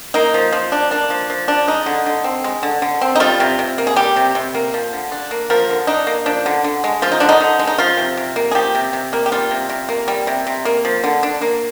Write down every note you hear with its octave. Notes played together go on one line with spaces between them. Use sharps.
A#3 D#4
F3
F3
D4
A#3 D4
F3
F3
D4
G#3 D#4
D3
D3
C4
G#3
D3
D3
C4
D#4
G3 F4
C3
C3
A#3
G#4
G3 G4
C3
C3
A#3
F3
D3
D4
A#3
F3 A#4
D3
D4 D#4
A#3
F3 D4
D3
D3
G#3
F3 F4
D#4
D3 D4
D#4
D3
G#3
D#4
F3 F4
C3
C3
A#3
G#4
F3 G4
C3
C3
A#3
G4
G3 F4
C3
C3
A#3
G3
C3
C3
A#3
F3
D3
D4
A#3